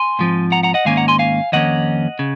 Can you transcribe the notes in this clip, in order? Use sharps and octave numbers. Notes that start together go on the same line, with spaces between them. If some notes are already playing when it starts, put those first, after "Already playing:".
Already playing: G#5 C6
G#2 F3 C4
F#5 A#5
F#5 A#5
D#5 F#5
G#2 D#3 A#3 C#4 F5 G#5
F#5 A#5
G#5 C6
F5 G#5
F2 D#3 A#3 C#4 D#5 F#5
C#3